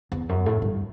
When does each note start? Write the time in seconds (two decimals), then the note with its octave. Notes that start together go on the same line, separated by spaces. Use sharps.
0.12 E2
0.29 F#2
0.46 A2
0.62 G2